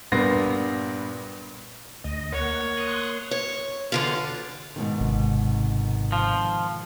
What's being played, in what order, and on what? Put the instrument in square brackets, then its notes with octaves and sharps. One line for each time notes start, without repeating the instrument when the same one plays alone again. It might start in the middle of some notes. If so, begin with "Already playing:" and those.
[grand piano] G2 A#2 A#3 B3 A#6 C7
[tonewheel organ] D2 D#5
[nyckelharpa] A#3 C#5 [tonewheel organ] F#5
[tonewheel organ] C6 D#6 F#6
[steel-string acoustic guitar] C#5
E2 D3 F4
[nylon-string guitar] G#2 B2 D#3
[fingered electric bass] G#1 C3
[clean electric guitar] F3